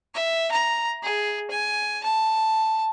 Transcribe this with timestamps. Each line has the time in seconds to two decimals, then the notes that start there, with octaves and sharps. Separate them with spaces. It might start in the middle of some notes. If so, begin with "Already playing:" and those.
0.15 E5
0.52 A#5
1.03 G#4
1.51 G#5
2.04 A5